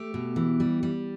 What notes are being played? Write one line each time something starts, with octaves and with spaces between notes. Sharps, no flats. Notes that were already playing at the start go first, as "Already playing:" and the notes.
Already playing: A3 G4
B2
E3
G3
G3